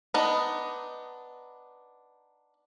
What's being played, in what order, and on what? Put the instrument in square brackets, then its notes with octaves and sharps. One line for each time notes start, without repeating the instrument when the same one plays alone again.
[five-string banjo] B3 D4 D#4